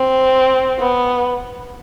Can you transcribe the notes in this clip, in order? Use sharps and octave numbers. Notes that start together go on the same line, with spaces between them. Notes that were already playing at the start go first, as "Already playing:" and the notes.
Already playing: C4
B3